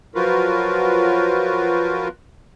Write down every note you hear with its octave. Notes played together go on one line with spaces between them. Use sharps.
F3 F#3 F4 F#4 A#4 B4